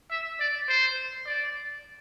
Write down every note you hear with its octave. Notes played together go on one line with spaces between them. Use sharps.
E5
D5
C5
D5